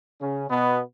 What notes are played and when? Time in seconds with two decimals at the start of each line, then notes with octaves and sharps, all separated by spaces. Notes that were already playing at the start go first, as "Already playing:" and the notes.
0.21 C#3 C#4
0.50 B2 B3